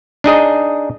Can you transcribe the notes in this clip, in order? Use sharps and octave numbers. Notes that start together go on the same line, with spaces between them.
D4 D#4 G#4 D#5